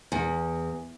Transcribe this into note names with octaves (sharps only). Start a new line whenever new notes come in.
E2